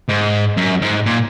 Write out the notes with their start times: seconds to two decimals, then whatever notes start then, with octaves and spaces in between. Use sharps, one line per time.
0.08 G#2
0.57 F#2
0.82 G#2
1.07 A#2